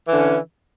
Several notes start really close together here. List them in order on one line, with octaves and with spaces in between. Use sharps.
E3 D3 C#4